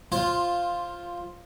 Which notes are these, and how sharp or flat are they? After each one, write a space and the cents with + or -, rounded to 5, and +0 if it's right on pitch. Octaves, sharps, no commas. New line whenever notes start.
F4 +0 C5 +15